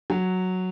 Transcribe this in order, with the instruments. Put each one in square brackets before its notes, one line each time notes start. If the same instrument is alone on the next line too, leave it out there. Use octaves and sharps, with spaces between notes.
[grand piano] F#3